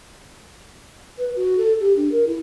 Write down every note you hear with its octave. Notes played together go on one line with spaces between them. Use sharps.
B4
F#4
A4
G4
D4
A#4
E4